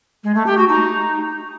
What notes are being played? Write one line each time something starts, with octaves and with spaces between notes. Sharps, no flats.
G#3
A3
G4
F#4
D#4